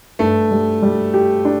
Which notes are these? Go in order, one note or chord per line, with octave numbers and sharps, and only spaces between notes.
G2 A3
G3
G3
G4
D4